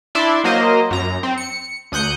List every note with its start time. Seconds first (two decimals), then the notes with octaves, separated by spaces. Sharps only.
0.15 D4 E4 D5 E5 C6
0.44 F#3 A#3 A#4 C5 D#5
0.91 F#2 A#5
1.23 C4
1.38 C#7
1.92 D2 D#6 F#6 G6 C#7